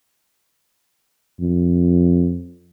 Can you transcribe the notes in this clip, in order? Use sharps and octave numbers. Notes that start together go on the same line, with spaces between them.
F2